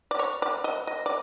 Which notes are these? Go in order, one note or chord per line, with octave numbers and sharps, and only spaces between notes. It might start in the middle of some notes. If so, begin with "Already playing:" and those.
D5
C#5
D5
D#5
D#5
D5